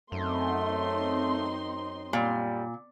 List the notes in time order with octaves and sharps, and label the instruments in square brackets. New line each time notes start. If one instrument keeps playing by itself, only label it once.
[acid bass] F#2 [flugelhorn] A3 [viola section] C4 D#4 C6
[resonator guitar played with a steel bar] A#2 [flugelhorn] G3